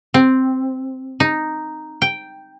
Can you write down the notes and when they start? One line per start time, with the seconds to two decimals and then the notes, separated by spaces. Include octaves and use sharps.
0.14 C4
1.20 D#4
2.02 G5